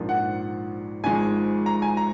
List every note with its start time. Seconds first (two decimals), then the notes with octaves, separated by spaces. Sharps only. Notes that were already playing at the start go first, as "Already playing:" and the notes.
Already playing: A#1 G#2 F3 A#3
0.09 F#5
1.04 G#1 G#2 F3 G#3 G#5
1.66 A#5
1.82 G#5
1.97 A#5